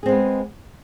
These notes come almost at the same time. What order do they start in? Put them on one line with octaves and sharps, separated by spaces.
G#4 C4 G#3 B3